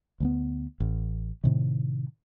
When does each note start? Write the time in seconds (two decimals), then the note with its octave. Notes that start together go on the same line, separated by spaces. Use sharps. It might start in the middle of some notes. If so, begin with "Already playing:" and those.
0.20 D2 G#3 B3
0.80 A1
1.44 A2 C3 D#3